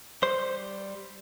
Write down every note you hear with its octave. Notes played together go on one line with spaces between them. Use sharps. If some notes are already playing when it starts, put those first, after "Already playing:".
G3 C5